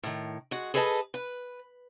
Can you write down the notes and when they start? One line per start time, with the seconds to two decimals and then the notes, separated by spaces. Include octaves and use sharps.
0.03 A2 D#3
0.51 G#3 F#4
0.74 G#4 A4 B4 D#5 G5 A5
1.14 B4